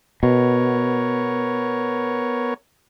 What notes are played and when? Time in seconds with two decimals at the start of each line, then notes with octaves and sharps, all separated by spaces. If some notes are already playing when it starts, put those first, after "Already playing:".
0.23 B2 B3 A#4 C#5